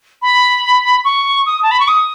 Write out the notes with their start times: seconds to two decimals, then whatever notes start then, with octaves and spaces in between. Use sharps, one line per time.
0.22 B5
1.05 C#6
1.46 D#6
1.63 A5
1.71 B5
1.80 C#6
1.88 D#6